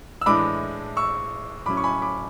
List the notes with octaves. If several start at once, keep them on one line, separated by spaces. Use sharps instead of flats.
E6
A2 E3 G#3 D4 B5 D6
C#6 E6
A2 F#3 C#4 B5 D6
C#6
G#5 B5
B5 D6